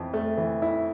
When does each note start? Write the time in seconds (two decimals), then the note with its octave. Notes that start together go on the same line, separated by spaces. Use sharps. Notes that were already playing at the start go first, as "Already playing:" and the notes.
Already playing: F2 E3
0.14 A3
0.37 E3
0.62 E4